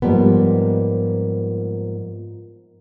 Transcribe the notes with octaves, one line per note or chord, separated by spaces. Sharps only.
G#2 F3 G3 A#3 B3